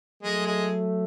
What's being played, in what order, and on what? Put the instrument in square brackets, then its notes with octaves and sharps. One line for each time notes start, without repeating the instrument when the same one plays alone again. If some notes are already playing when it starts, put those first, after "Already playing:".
[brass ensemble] F#3 A3 [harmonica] G#3
[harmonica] G#3